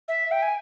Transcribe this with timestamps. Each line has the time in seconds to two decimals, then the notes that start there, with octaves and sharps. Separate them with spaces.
0.08 E5
0.31 G5
0.42 G#5